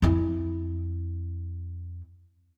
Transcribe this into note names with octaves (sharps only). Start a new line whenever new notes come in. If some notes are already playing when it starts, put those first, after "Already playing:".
F2 E4